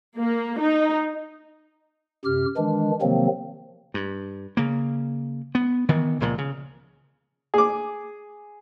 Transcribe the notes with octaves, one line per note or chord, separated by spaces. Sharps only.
A#3
D#4
F#2 C3 G4 F6
D#3 E3 G#3 D4
C3 D#3 F3 F#3 A#3 C4
G2
C#3 A#3
B3
D#3 E3 B3
C#2 A#2 F3
C#3
G#4 D6